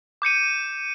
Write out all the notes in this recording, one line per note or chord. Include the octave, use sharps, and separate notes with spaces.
D6 G6 C#7 D#7